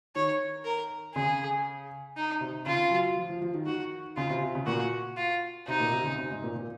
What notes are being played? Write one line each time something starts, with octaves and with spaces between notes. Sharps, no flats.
D#3 C#5
A#4
C#3 G#4
D#4
C3
C#3 F4
F#3
F3
F3
F3
D#3
D#3 F#4
C#3 F4
C3
C3
C#3
A#2 F#4
F4
C3 D#4
A#2
C3
D#3
C#3
C3
G#2
A#2
A#2